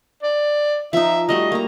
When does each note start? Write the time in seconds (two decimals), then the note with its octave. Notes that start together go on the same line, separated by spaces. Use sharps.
0.23 D5
0.93 F3 D#4 E5
1.29 G3 A3 F#4 D#5
1.52 A#3 A#5